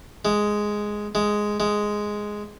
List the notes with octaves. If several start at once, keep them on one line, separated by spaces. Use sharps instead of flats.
G#3
G#3
G#3